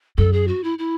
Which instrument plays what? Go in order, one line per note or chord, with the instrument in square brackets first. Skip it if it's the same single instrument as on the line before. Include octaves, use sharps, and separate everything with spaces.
[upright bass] F#2 [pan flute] A4
[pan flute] G#4
F#4
E4
E4